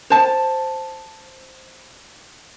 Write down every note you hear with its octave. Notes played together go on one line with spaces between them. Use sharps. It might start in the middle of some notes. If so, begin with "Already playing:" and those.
C5 A5